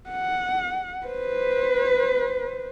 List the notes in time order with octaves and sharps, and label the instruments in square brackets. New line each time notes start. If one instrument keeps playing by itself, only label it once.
[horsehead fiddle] F#5
B4 C5